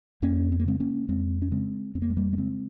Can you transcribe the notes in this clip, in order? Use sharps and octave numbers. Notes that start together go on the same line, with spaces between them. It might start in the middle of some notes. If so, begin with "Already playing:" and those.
F2 A#3 C#4
C4
A#3
C#3 G#3 C4
A#3 C#4
F2 G#3 C4
C#4
C#3 G#3 C4
F2 C4
A#3
G#3
G3 A#3
A#3
C#3 G#3 C4